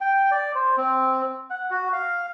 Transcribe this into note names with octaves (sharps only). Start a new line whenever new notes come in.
G5
D5
C5
C4
F#5
F#4
F5